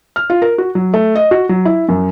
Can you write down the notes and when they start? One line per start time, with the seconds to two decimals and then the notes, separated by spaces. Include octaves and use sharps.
0.16 F6
0.30 F4
0.42 A#4
0.58 F#4
0.75 F#3
0.94 A3
1.15 D#5
1.31 F#4
1.49 F#3
1.65 E4
1.88 F#2